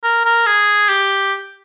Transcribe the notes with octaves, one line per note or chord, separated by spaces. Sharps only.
A#4
A#4
G#4
G4